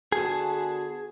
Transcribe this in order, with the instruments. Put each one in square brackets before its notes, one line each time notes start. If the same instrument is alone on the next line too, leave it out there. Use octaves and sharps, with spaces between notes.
[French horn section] D3 B3 F#4 [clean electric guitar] G#4 [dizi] A5